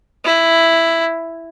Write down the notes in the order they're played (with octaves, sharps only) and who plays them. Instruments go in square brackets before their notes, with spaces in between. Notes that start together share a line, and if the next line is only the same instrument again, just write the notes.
[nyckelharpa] E4